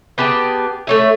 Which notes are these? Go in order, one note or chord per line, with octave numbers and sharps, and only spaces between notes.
B3 G4 G#4 A5
A3 C#5 E5